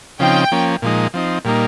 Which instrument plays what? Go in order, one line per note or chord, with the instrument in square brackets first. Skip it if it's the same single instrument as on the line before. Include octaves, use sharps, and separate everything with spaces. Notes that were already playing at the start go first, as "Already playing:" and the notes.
[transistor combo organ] C#3 F3 C4 D#4 [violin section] G5
[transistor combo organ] F3 A#3 C#4
A#2 F3 G#3 D#4
F3 C4 D#4
A#2 G3 A#3 D#4